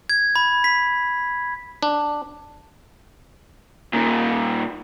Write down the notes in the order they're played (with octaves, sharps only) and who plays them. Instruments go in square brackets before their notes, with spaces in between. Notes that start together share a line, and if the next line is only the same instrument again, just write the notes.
[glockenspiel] G#6
B5
B6
[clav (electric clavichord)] D4
[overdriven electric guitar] A#2 D#3